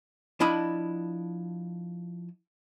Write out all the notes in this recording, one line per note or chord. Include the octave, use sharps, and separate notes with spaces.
F3 D4 E4 D#5 B5